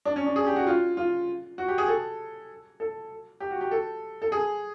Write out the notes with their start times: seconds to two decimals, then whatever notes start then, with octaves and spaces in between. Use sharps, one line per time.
0.05 D4
0.16 C#4
0.26 D4
0.36 G#4
0.47 G4
0.56 F#4
0.67 F4
0.97 F4
1.58 F#4
1.68 G4
1.78 G#4
1.88 A4
2.80 A4
3.40 G4
3.51 F#4
3.61 G4
3.71 A4
4.22 A4
4.32 G#4